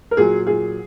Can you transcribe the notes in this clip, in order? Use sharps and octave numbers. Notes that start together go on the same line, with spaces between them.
A#4
A#2 F#3 G#4
A#2 F#3 G#4